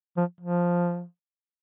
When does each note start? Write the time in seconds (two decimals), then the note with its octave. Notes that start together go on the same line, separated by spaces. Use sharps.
0.17 F3
0.40 F3